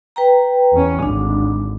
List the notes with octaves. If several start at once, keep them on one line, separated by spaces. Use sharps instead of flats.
B4 G5 A#5
E2 C#4
G#1 D2 D4